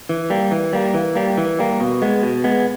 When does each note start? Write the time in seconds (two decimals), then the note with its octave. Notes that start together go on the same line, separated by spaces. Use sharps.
0.09 E3
0.30 G3 A#3
0.51 E3
0.73 G3 A#3
0.94 E3
1.15 G3 A#3
1.38 E3
1.59 G3 A#3
1.80 B2
2.02 G#3 B3
2.22 B2
2.44 G#3 B3